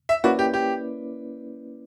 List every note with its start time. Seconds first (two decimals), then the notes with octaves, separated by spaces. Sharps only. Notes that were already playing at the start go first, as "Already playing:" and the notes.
0.09 E5
0.24 A#3 C#4 E4 F#4 B4 D5
0.39 G4
0.54 G4